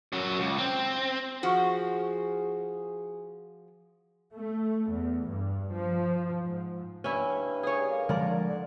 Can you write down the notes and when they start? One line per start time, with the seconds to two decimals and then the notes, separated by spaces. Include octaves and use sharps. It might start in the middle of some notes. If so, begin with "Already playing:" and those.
0.12 F#2 F#3
0.40 C#2
0.58 C4
1.43 F3 F#4 G#4
4.34 A3
4.90 E2
5.27 G2
5.73 F3
6.45 G#2
7.04 G2 C#4 E4
7.63 G#4 C#5
7.90 A#3
8.09 D3 F3 G#3 A#4 D5
8.48 D3